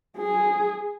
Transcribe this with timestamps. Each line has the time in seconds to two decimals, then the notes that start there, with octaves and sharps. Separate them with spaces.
0.18 G#4